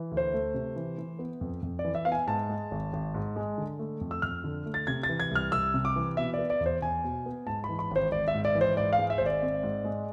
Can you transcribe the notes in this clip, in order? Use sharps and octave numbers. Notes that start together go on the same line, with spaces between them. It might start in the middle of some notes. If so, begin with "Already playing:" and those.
Already playing: E3
D2
C5
A3
C3
E3
E3
B3
F2
F2
D5
E3
E5
B3 F5
G#5
G#2 A5
G#3
G#1
G#1
G#2
G#3
D3
A3
F2
E6
F2 F6
D3
A3
A6
C3 G#6
A6
E3
G#6
C2 F6
C2 E6
C3
D6
E3
B2 E5
B3 D5
D5
E2
C5
E2 G#5
B2
B3
G#2 A5
B5
E3
B5
G#1 C5
G#1 D5
E5
G#2
D5
E3
C5
G#2 D5
F5
G#3
E5
C5
G#1
D5
C4
G#2
G#3